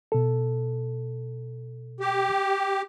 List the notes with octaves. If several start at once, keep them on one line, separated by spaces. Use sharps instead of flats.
B2 A4
G4